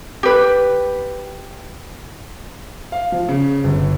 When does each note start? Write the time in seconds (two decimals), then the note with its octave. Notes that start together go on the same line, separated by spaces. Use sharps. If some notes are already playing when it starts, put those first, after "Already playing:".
0.23 G4 B4
2.92 F5
3.12 F3
3.29 C#3
3.64 G1